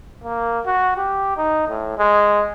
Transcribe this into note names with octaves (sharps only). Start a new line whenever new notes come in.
A#3
F#4
G4
D#4
A2
G#3